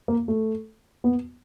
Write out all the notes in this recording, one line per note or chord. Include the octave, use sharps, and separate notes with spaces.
A#3
A3
B3